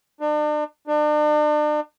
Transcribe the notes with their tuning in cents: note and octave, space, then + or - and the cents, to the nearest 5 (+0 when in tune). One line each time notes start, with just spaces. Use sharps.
D4 +40
D4 +40